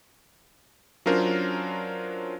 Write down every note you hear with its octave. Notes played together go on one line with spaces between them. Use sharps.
F#3 C#4 D4 F4 A#4 C5